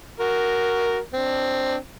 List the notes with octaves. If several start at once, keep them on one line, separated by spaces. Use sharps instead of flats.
F#4 A#4
C4 D4